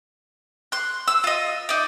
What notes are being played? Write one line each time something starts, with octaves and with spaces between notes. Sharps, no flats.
C6 F#6
E6
F4 D#5
D#4 D5